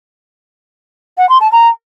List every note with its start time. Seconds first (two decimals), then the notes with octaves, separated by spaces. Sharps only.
1.18 F#5
1.29 C6
1.40 A5
1.52 A#5